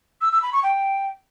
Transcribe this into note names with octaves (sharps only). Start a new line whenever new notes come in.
E6
E6
B5
C#6
G5